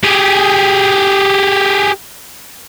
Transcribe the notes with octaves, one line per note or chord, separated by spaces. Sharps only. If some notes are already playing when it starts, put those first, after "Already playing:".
G4 G#4